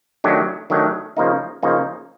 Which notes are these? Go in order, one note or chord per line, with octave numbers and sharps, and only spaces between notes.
D#3 F#3 A3 D4 G4
D#3 F#3 A3 D4 G4
C#3 F3 A#3 D#4
C#3 F3 A#3 D#4